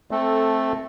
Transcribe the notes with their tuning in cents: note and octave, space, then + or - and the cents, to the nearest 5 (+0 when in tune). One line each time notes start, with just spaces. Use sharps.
A3 -5 C4 +10 A4 +0